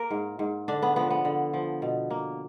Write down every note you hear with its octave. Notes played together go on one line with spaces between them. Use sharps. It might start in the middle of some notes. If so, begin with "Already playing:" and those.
Already playing: A#3 A#4
G#2
G#2
D3 D4
B3
F3 B3
B3
D3
F3
B2
A#3